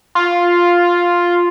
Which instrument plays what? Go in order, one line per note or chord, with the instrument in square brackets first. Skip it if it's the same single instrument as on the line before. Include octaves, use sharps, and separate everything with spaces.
[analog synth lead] F4